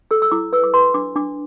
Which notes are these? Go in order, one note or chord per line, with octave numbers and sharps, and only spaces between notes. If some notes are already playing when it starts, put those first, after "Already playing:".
A4 E6
E6
E4 D6
B4 E6
D6
B4 C6
D4 D6
D4 D6